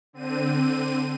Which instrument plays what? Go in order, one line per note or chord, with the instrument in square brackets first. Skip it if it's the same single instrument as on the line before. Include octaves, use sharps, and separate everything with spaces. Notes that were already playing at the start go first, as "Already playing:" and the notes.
[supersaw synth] D3 C4 D#7